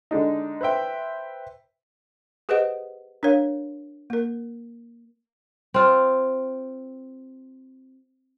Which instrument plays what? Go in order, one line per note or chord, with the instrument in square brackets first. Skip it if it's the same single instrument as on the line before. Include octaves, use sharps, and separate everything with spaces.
[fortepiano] D3 G#3 D4 D#4
B4 C5 E5 G5
[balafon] G4 G#4 B4 C5 D#5 F#5
D4 A#4 C#5 F5
A#3 A#4
[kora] C4 F4